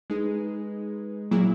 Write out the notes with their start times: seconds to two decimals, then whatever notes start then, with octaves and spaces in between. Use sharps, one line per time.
0.10 G#3 D#4 G#4 B4
1.31 A#2 F#3 A#3 E4 G#4